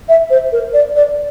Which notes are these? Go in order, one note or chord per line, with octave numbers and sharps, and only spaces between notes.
E5
C5
A#4
D5
D5